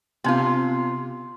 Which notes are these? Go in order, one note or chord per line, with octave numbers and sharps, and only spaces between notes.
C3 B3 C4 F4